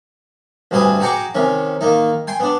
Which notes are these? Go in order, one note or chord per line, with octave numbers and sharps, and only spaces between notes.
D2 G2 C4 B4 G#5 D#6
F#4 G#4 G5 A#5 C#6 D6
C3 D#3 C#4
D#3 A#3 D#4
G5 G#5 C6
B3 D4